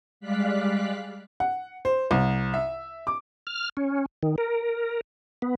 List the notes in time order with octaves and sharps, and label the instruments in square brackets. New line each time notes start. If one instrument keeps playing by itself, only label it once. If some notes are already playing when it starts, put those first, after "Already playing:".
[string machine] G3 G#3 D5 F5 F#6 B6
[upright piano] F#5
C5
C2
E5
D6
[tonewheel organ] F6
C#4
D#3
A#4
B3